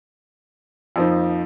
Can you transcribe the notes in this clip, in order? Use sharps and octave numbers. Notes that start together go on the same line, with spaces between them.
F2 F3 A#3 D#4